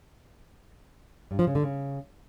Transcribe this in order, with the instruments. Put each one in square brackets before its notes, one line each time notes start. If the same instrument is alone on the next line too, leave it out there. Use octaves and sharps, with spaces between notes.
[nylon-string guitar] G2
F3
C#3
D3
C#3